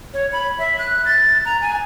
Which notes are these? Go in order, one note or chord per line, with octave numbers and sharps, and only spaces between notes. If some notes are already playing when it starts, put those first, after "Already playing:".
C#5
B5
E5
F#6
A6
A#5
G#5